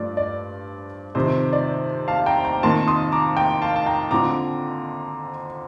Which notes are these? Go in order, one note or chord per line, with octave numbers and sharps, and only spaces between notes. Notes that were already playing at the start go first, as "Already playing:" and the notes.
Already playing: G2 F3 A3 D5
D5
F2 C3 D#3 C5
D5
F5 A5
G5 A#5
G5 A#5
F2 D#3 A#3 A5 C6
C6 D#6
A#5 D6
G5 A#5
F5 A5
A5
G5 A#5
F2 D3 F3 A#5 D6